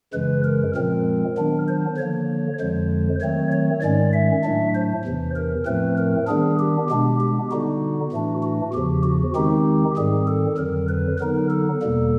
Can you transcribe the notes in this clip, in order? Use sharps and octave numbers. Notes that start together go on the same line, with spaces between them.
F#2 C#3 E3 G#3 B4
A#4
A#2 F3 G#3 C4 A#4
D#3 F#3 B3 D4
C5
D3 F3 A#3 C#5
F2 D3 F3 G#3 C5
D#3 F#3 A3 C4 C#5
C#5
G#2 D#3 G#3 C#4 D5
E5
A2 F#3 A3 D4
C5
E2 C3 E3
A#4
A2 F3 A3 C4 B4
A#4
D#3 G3 B3 D4 G#4
G4
B2 G#3 B3 D4 G4
G4
D3 G3 B3 D#4 F#4
A2 E3 A3 D4
F#4
E2 C#3 F3 G4
F#4
D#3 G#3 C4 D#4 G4
G#2 D#3 G3 C4 G#4
A4
F2 D3 F#3 A#4
B4
D3 F#3 B3 D#4 A#4
A4
E2 B2 G3 A#3